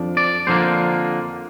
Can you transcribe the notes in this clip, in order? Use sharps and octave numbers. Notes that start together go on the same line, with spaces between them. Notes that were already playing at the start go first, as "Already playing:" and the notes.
Already playing: F2 F3 D4
D5
F2 D3 F3 A#3 C5